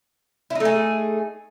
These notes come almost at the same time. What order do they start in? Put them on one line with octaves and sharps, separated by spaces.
E4 D#4 A3 G#4